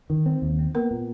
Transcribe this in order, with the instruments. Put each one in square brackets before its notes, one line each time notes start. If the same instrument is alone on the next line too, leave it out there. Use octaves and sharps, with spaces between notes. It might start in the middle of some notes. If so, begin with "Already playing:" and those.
[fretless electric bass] D#3
C4
D#2
C4
[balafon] A#3 A#4 [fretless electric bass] B3
[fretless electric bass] A#2